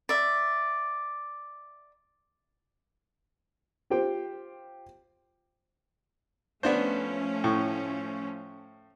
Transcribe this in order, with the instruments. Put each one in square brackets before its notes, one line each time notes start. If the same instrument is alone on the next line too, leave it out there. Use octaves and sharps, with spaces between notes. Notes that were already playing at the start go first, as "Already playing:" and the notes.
[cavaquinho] D5 E5
[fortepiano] F4 G4 C5 G5
[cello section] F3 A3 C#4 [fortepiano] B3 D4 C5
[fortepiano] A2